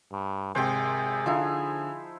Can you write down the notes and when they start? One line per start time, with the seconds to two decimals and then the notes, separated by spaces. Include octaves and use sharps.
0.12 G2
0.55 G#1 C3 G#4 C5 G5
1.26 D3 F3 D#4 E4